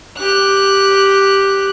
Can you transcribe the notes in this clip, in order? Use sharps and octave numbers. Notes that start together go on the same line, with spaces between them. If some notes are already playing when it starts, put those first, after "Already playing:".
G4 F#6